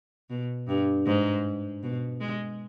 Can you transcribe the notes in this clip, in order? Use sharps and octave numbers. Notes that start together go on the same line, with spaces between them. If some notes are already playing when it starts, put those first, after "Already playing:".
B2
G2
G#2
B2
G#3